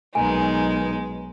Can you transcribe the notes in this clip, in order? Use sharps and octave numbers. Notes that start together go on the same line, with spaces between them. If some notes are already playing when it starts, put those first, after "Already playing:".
B1 D#3 G#3 D#4 G#5